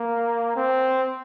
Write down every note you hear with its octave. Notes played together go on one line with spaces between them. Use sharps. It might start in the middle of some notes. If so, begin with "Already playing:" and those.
Already playing: A#3
C4